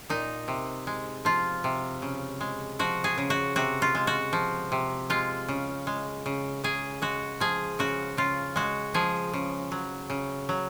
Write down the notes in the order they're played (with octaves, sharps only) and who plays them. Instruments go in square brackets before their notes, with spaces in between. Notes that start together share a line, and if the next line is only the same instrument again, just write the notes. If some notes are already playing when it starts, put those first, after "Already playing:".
[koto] A#2 D#4
C3
G#3
F3 F4
C3
C#3
G#3
F3 F#4
G#4
C#3
F#4
C3 F#4
F4
G#3
F#4
F3
C3
G#3 F4
C#3
G#3
C#3
C#3 G#4
G#3 F#4
F3 G#4
C#3 F#4
C#3 F4
G#3 F#4
F3 G#4
C#3
F#3
C#3
F#3